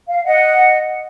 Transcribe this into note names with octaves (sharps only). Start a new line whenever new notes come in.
F5
D#5 F#5